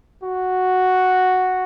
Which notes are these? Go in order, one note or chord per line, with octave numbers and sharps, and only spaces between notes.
F#4